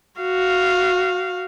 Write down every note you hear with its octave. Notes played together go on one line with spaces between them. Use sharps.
F#4 F5